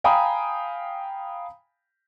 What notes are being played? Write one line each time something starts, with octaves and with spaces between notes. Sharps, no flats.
F5 G5 G#5 A#5 B5 D#6